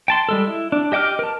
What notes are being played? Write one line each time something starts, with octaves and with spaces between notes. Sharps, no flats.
G5 A5 C6
G3 G#3 A4
E4
D4
G4 D#5 G5 D6 F6
A#4 A5